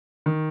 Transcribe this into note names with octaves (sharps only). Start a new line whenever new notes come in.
D#3